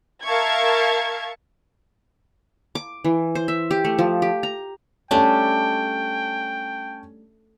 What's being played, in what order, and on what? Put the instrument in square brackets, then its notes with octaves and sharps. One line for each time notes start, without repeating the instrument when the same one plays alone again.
[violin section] A#4 E5 F5 A5 C#6 G#6
[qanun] D6
E3
C5
E5
G4
A3
F3
G4
A#5
[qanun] G3 A3 D4 [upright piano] C#4 A5 [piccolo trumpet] G5